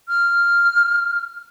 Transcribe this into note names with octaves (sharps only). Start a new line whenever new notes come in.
F6